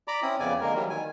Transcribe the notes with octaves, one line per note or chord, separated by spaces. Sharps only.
D5 A#5 B5 D6
C4 C#4 E4 D#6
F2 C#3 B3 D5 G#5
D3 G#3 A#3 A#4
E3 F#3 G3
D#3 G#5